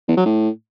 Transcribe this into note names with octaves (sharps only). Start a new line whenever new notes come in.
E2
F#3
A2